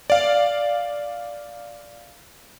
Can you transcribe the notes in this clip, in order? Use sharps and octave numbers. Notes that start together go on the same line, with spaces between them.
D5 F5